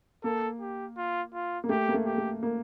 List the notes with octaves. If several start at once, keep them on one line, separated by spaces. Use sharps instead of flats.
A#3 A4
G4
F4
F4
A#3
A3 G4
A#3
A3
G4
A3
A#3